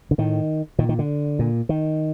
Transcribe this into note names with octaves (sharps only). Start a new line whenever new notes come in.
D3
A2 D#3
A#2 D#3
D#3
D3
A#2
D#3